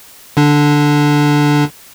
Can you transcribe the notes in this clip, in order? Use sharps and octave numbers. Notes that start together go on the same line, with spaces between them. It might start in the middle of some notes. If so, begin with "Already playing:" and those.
D3 D4